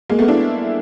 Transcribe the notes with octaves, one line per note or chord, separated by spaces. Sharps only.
G#3 A#3
A3 B3
D4 E4